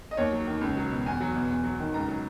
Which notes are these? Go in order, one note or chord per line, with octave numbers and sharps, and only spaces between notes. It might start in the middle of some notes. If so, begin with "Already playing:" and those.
D#5
D#2 C#5
F#3
D#3
C#2
F#3
B2
E2 G#5
F#3
B2
E2
F#3
D#3
C#2 A#5
F#3